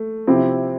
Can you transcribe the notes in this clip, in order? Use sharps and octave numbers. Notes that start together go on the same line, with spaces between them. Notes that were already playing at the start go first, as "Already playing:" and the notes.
Already playing: A3
C3 F3 C4 E4 G4